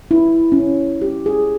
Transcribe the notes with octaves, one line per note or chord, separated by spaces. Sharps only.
E4
C#4
G4
G#4